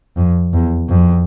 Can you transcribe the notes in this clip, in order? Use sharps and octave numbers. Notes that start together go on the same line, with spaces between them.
F2
E2
F2